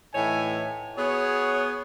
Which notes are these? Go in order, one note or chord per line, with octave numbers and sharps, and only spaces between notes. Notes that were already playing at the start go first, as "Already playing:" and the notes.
A2 E3 D#4 C#5 E5 G#5
B3 F#4 G#4 C#5